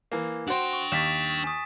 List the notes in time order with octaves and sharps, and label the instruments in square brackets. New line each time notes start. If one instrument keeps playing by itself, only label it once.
[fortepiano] E3 A#3
[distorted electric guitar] D4 G5 [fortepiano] F#4 C5
[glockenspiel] C#6
[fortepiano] D#2 [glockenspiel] A6 B6 E7
[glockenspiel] G#5 D#6